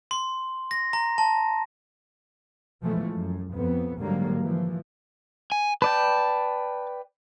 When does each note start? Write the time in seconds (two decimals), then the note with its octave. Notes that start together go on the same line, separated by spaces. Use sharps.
0.11 C6
0.71 A#6
0.93 A#5
1.18 A5
2.82 B2 E3 F3 G#3 A3
3.12 F#2
3.54 F2 B3
4.01 G#2 D3 F#3 G3 A#3
4.41 E3 F3
5.52 G#5
5.82 B4 D5 G5 A5